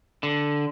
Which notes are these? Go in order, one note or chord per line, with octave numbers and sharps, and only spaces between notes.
D3